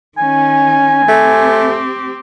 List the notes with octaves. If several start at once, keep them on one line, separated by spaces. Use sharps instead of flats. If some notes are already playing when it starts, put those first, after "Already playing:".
D#3 C#4 G#5
A3 C4 G4